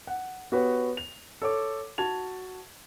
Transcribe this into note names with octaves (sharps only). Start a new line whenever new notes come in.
F#5
B3 F#4 G4 B4 C#5
F7
A4 C#5 D6
F#4 A5 G#6 F7